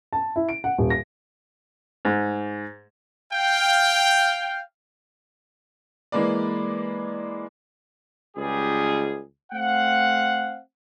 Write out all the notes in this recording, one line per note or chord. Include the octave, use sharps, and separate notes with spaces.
A5
E4
D7
F#5
D#1
A#6
G#2
F5 G5
E3 G#3 A#3 B4 D5
C#2 G3 G#4
A3 C4 F5 F#5